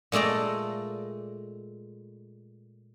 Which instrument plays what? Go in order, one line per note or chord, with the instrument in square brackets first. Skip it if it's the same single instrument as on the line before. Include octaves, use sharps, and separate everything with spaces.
[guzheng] A#2 G#3 A3 D5 A#5